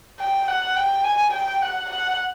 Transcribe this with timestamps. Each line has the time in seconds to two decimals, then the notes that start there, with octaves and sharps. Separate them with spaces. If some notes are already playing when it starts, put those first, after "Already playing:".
0.20 G5
0.48 F#5
0.76 G5
1.04 G#5
1.34 G5
1.62 F#5
1.90 F#5